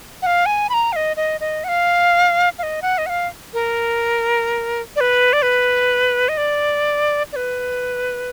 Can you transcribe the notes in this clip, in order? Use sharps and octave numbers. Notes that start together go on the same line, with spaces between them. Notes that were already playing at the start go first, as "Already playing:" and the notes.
F#5
F5
G#5
B5
A#5
F5
D#5
D#5
D#5
F#5
F5
F5
D#5
F#5
D#5
F#5
F5
A#4
D5
B4
D5
B4
D#5
D5
D5
B4